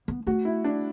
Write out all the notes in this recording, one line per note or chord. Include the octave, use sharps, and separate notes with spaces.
B3
A3 F#4
E4
D4